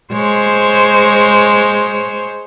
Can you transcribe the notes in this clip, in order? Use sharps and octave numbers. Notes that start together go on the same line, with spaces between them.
G#3 C5 C#5